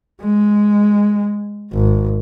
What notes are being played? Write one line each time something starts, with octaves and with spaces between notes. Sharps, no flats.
G#3
G#1